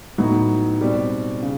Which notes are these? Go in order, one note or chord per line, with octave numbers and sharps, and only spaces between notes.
A2 F#3 B3 D#4 F#4
B2 G3 C4
C#3